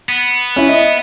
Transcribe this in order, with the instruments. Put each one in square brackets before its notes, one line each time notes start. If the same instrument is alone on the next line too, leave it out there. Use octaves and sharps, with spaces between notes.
[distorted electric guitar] B3
[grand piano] C#4 E4
D#5 E5